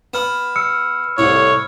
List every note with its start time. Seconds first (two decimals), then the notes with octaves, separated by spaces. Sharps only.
0.14 B3 B5 F6 E7
0.56 E6 F6 C#7
1.18 C2 A2 C#5